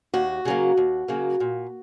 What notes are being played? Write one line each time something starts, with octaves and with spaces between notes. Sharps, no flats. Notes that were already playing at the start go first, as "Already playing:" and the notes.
D#2 F#4
C#3 F#3 A#3
D#2
C#3 F#3 A#3
A#2